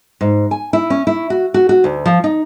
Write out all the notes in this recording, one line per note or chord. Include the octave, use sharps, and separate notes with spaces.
G#2
G#5
E4
C#4
E4
F#4
F#4
F#4
D2
F3
D#4